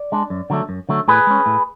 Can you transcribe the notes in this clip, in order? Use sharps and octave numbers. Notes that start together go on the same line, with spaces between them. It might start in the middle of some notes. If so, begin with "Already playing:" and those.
Already playing: D5
G#3 D4
F#2
D3 F#3 A3
F#2
D3 F#3 A3
A2 G#4 B4
G#3 C#4
A2